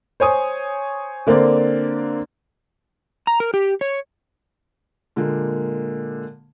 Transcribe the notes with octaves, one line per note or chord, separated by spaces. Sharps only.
C5 C#5 G#5 D#6
D3 A#3 C4 C5 D5
A#5
A#4
G4
C#5
A#2 D3 G#3 A#3